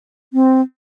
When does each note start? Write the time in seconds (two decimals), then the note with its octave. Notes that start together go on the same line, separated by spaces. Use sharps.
0.33 C4